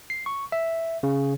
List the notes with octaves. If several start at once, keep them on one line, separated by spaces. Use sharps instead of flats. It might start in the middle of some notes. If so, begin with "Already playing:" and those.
C7
C#6
E5
C#3